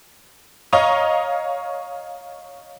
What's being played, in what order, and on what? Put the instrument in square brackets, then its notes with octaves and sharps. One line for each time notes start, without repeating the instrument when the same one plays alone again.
[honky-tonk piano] C#5 D#5 F5 A#5 C#6 D#6